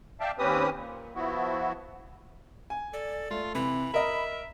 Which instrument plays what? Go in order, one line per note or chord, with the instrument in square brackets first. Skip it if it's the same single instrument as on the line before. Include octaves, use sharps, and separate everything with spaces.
[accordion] D5 E5 F5 G5 A5
D#2 C4 C#4 G4 B4 D#6
A#2
F3 B3 E4 F#4
[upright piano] G#5
[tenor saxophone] A4 [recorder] D5
[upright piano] A3 [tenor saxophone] F4
[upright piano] C3 [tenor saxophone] E3 [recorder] B5
[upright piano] A#4 D#5 [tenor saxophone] E5